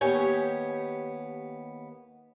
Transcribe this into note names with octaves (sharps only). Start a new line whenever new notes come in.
D#2 B3 G4 C#5 G#5